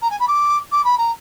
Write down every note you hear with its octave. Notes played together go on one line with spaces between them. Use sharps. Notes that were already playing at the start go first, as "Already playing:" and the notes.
A#5
G#5
B5
D6
D6
B5
A#5